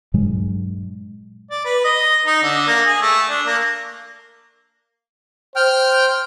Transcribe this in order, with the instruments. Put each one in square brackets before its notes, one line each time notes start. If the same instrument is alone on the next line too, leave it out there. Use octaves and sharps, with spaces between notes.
[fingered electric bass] G2 A#2 F#3 G#3
[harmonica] D5
B4
D#5
D#4
D3
A#3
G#4
A3
D4
A#3
[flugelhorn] C5 [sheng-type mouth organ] G5 F6